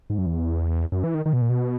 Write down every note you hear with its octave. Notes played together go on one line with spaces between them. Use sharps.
G#2
F#2
E2
F#2
E3
D#3
D#3
B2
A#2
B2